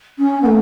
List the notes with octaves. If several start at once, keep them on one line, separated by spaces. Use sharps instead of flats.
C#4
B3
A3